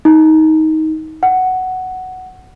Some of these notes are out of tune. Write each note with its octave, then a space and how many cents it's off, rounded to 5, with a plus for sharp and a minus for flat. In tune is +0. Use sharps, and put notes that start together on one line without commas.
D#4 +15
F#5 +5